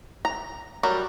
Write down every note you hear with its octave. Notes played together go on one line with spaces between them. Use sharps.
A#5
F#3 G3 A#4